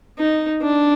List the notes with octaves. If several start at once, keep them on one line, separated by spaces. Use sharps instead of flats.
D#4
D4